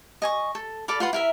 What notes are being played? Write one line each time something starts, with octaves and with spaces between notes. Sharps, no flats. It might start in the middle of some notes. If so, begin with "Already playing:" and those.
D#5 G#5 C#6
A4
A4 D5 F5 B5
F4 B4 F#5 C6
E4 A#4 E5